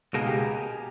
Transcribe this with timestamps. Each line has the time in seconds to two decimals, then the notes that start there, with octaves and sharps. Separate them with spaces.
0.13 C#2 B2 A#3 D#4 G#4
0.27 G4